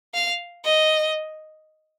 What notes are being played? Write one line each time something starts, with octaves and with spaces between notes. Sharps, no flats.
F5
D#5